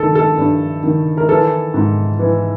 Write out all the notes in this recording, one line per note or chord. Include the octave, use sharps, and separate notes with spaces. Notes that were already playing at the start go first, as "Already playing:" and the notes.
Already playing: G2 D#3 A4
A4
G2
D#3
A#4
E3 A4
G#2
E3